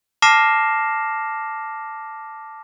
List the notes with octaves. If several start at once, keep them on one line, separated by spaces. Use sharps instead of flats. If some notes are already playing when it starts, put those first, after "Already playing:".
A5 D6 F6 A#6 C7 E7